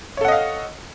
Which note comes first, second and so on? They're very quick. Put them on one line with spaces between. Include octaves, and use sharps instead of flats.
C#5 A4 F#5 D#5 F5